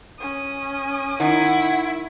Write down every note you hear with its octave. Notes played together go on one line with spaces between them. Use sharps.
C#4 D#6
D#3 D#4 E4 F#5